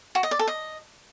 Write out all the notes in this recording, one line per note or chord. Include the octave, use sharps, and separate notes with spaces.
F#4
D#5
D5
A4
D#5